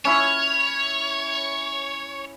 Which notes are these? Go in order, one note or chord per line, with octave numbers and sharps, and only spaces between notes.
C#4 E4 C#5